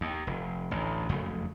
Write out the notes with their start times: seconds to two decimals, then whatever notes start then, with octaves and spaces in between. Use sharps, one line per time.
0.01 D#2
0.27 F1
0.71 A1 D2
1.09 F#1 F2 C#3 A3